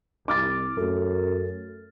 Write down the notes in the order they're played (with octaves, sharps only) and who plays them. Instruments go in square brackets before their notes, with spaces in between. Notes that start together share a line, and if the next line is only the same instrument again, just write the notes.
[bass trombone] C2 [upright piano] D6 F6 A6
[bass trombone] F#2 [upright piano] A3